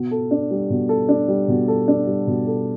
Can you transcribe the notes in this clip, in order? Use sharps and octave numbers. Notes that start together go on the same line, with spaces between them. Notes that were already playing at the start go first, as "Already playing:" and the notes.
Already playing: B2
A4
D4
G3
B2
A4
D4
G3
B2
A4
D4
G3
B2
A4